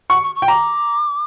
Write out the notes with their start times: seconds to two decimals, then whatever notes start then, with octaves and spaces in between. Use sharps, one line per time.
0.10 F#5 C#6
0.23 C#6
0.35 C#6
0.42 G5
0.48 A#5 D6